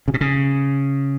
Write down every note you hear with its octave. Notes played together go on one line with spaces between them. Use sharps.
C#3
B2
C#3